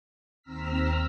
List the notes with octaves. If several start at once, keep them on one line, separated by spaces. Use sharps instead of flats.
D#2 C4 A#5 E6 F6 B6